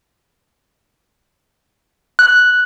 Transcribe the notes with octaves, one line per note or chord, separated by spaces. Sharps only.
F#6